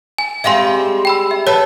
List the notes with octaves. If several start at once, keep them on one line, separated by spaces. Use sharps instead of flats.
G#5
G3 G#3 C4 E5 F5 C6
G5 B5 E6
E5
A4 B4 C#5